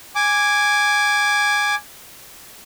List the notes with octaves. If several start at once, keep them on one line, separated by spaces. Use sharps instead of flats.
G#5 D6